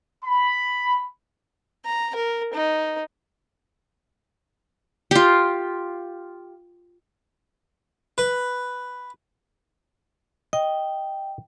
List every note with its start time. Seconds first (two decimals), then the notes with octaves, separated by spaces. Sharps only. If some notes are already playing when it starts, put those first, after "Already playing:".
0.24 B5
1.85 A#5
2.15 A#4
2.53 D#4
5.11 F4 G4
8.18 B4
10.53 D#5 G5